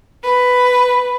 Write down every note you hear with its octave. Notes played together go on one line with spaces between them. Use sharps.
B4